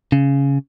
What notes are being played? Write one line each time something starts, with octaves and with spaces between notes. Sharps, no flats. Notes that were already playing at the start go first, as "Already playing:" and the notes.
C#3